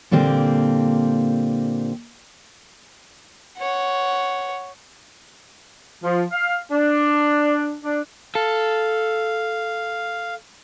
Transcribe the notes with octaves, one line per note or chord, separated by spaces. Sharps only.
A#2 D3 G3 A#3 C4
C#5 F#5
F3
F5
D4
D4
A4 F5